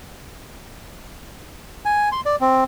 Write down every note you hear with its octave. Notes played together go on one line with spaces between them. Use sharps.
G#5
C6
D5
C4